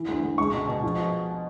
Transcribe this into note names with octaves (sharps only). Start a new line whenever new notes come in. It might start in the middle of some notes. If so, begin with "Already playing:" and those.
Already playing: E3
D2
D2
C#2 C#6
B2
B2
F3